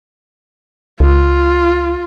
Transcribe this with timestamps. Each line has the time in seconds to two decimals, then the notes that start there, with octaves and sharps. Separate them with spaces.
1.00 C#2 F4